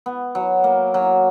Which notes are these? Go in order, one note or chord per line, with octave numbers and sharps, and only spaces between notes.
B3
F#3
A#3
F#3